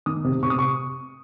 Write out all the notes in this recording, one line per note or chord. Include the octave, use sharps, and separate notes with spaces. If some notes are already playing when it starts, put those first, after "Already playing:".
D#3 D#6
C3
C3 C#6
D#6
C#6